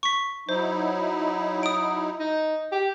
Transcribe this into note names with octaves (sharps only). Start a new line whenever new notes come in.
C#6 B6
F#3 D#4 E4 C5
D#6 D7
D#4
G4